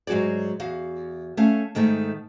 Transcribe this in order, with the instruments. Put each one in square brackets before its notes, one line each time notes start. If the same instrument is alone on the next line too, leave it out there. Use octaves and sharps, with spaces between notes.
[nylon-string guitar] G#2 F#3 F#4 G#4 D5
E2 F#4 F5
A3 C#4 F5
G#2 D#3 A3 D#4